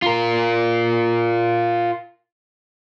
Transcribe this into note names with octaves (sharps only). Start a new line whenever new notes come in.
F4 A#4